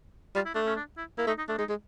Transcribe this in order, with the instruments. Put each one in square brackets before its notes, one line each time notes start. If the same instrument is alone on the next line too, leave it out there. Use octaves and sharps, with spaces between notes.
[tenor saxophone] G3 [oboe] F4
[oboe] E4
[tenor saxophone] A3 [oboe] D4
[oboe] C#4
D4
E4
[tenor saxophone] A#3 [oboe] E4
[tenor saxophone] A3 [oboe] D#4
[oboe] D#4
[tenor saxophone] A3 [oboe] D4
[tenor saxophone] G#3 [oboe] D#4
[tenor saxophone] G#3